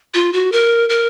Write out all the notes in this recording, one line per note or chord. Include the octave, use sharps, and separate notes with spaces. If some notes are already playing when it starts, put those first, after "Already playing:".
F4
F#4
A#4
A#4